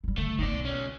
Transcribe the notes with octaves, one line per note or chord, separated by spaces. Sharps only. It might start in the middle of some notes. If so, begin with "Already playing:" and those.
E3 G3
D2 D3 A3
D#3 A3 A#3 D5
B1
C#2 C#4